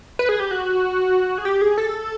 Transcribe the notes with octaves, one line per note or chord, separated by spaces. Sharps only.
B4
G#4
G4
F#4
G#4
G4
G#4
A4